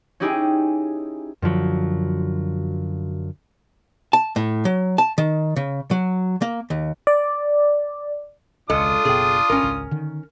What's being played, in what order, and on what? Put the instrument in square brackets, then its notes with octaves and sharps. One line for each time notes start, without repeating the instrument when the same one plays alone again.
[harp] C#4 D#4 E4 G4 G#4
[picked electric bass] F#2 D3 F3 F#3
[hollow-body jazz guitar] A5
A2
F#3
A5
D#3
C#3
F#3
A#3
D#2
[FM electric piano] D5
[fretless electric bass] E1 C#2 [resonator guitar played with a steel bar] G#3 A4 [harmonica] D4 F4 D#6
[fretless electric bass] F#1 B2 [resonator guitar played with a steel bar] G#4 G5
[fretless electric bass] G#1 [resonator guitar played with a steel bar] C#4 A#4
[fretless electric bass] G#1 C#2
D3 D#3